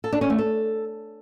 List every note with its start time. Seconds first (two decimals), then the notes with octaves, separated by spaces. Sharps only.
0.04 A4
0.13 D4
0.21 C#4
0.30 A3
0.39 A4